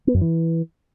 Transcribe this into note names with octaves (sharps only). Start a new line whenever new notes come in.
B3
F#2
E3